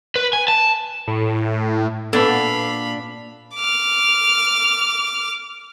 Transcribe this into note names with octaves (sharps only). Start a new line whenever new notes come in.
B4
G#5
A5
A2
A#2 B3 D4 A4 F5 B5
D6 F6